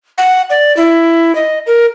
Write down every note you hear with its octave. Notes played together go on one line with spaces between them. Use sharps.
F#5
D5
E4
D#5
A#4